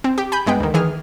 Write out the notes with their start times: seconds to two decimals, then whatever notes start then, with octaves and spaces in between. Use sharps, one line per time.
0.04 C4
0.18 G4
0.32 G#5 B5 G6
0.46 G1 G#3 B3 G5
0.60 D2 D#3
0.74 D#3 E3 G#4 F6